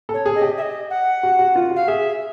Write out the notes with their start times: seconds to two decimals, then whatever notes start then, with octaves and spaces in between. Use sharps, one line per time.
0.09 A4 C#5
0.26 G#4
0.35 D#5
0.41 G4
0.57 E5
0.62 D#5
0.90 F#5
1.23 F#4
1.39 F#4
1.55 F4
1.71 F#4
1.76 F5
1.88 G#4 E5